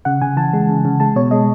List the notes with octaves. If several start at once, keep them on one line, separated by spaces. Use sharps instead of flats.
C#3 F#5
C#3 G#5
E3 A5
G#3
C#3
C#3
G#3 A5
B2 C#5
G#3 D#5